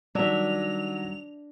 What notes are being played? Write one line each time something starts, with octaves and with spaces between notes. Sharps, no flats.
D#3 F#3 G3 D4 E5 F7